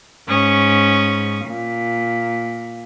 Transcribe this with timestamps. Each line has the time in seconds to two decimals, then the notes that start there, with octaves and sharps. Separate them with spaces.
0.28 G#2 C#4 C#6 D#6
1.45 A#2